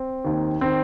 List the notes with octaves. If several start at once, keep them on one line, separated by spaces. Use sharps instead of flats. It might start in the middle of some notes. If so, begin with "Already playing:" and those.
Already playing: C4
D#2 D#3
D#3 C4